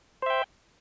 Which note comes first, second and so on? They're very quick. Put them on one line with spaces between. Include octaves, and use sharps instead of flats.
C5 E5 G5